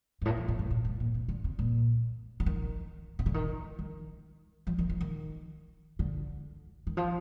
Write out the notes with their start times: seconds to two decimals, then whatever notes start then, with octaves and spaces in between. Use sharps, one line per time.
0.22 G2
0.25 A2
0.37 F3
0.48 A#2
0.59 G2
0.71 A2
0.85 G2
1.00 A#2
1.14 C3
1.28 D3
1.44 C3
1.59 A#2
2.40 D3
2.46 D#3
3.19 C3
3.26 D3
3.34 D#3
3.79 D#3
4.67 F3
4.78 D#3
4.90 F3
5.01 D#3
5.99 D3
6.87 D#3
6.97 F3